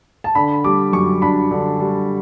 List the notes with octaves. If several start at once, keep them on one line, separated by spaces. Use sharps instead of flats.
A5
D3 B5
G3 D6
F#2 C#6
D4 B5
D3
G3